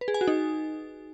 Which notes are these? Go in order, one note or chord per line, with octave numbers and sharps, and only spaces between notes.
B4
G#4
G#5
F#4
D#4